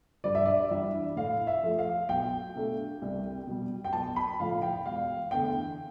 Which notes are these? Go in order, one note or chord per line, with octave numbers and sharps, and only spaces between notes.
G2 D5
E5
D5
E3 G3 D4 E5
A2 F5
E5
F3 A3
F5
B1 G5
B2 A3 D4
C2
B2 G3
G5
B1 A5
B5
A2 F3 F5
G5
E1 F5
E2 D3 A3 G5